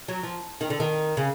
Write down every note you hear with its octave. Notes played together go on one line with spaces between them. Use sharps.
F#3
F3
D#3
D3
D#3
C#3